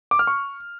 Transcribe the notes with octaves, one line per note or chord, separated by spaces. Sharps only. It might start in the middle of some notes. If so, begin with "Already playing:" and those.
D6
F6
C#6